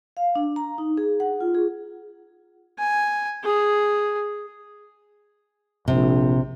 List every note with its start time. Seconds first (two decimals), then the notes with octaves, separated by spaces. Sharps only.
0.17 F5
0.35 D4
0.56 A#5
0.78 D#4
0.97 G#4
1.20 F#5
1.41 F4
1.55 G#4
2.79 G#5
3.44 G#4
5.88 A#1 C3